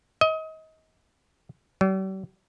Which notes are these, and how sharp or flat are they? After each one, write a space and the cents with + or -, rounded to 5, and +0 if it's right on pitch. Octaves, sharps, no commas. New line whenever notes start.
D#5 +30
G3 -45